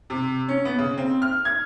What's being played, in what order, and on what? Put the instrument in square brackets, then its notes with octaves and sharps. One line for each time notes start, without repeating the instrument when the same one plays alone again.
[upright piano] C3
C#4
B3
C#3
C4
F6
G#6